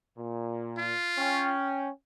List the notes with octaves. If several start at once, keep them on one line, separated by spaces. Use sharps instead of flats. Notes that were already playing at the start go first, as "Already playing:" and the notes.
A#2
F4
C#4 G5